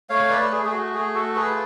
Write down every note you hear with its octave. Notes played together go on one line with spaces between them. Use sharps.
A3 C#5 F5
B4 D5
A3
G#4
A3 G#4
F#4
A3 G#4
F#4 A4
A3
G#4 B4
F4